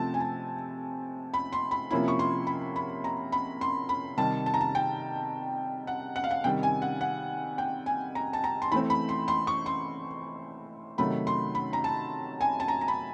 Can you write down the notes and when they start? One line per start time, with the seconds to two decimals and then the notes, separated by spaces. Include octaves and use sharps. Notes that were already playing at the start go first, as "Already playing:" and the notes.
Already playing: C3 F3 A3 C4 A5
0.14 G#5
0.20 A5
1.34 B5
1.53 C6
1.71 B5
1.91 C3 F3 A#3 C#4 E4 B5
2.08 C#6
2.19 C6
2.47 B5
2.76 B5
3.04 A#5
3.32 B5
3.61 C6
3.89 B5
4.17 C3 D#3 G3 A5
4.46 A5
4.54 A#5
4.61 A5
4.75 G5
5.87 F#5
6.16 F#5
6.24 F5
6.31 F#5
6.44 C3 D#3 G3 G5
6.63 G#5
6.82 F#5
7.01 F#5
7.58 G5
7.86 G#5
8.15 A#5
8.33 A5
8.44 A#5
8.62 C6
8.72 E3 A3 C4 B5
8.90 B5
9.09 C6
9.28 C6
9.47 C#6
9.66 C6
10.98 C3 D#3 F#3 A3 B5
11.27 C6
11.55 B5
11.73 A#5
11.84 A5
12.41 G#5
12.60 A5
12.68 A#5
12.81 A#5
12.88 B5